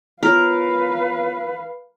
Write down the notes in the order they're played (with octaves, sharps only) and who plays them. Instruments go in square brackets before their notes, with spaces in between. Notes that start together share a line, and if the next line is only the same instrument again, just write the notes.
[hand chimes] B3 F4 C#5 [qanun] A#4 [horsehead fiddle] B4 F5